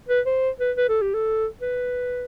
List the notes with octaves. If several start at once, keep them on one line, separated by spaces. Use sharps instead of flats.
B4
C5
B4
B4
A4
G4
A4
B4